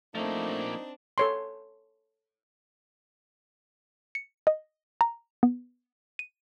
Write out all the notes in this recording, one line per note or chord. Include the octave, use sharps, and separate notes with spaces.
F3 A3 A#3 C4 D4 D#4
A4 C#5 C6
C#7
D#5
A#5
B3
D#7